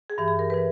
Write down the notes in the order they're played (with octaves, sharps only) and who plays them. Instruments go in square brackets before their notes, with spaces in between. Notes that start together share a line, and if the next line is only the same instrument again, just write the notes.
[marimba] G#4
G2 E3 G4
G#4
A#4
B4
E3